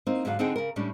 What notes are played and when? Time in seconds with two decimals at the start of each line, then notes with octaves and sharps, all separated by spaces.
0.07 A#3 C4 D#4
0.25 G#2 D3 F#3 F#4 C5 F5
0.39 D3 C4 D#4 G#4 F#5 G5
0.56 C#3 A#4
0.76 A2 G3 C#4 D4